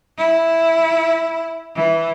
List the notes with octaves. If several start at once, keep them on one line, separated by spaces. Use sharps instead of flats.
E4
E3